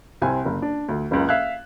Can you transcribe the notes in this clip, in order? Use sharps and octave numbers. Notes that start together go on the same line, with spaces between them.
C2 C3 C4 G#5
F#1
D4
D2
F#1 C#2
E5 F5 F#6 G#6